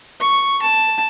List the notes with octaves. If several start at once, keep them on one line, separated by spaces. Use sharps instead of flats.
C#6
A5